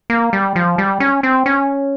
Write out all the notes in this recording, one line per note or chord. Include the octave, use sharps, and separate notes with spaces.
A#3
G3
F3
G3
C#4
C4
C#4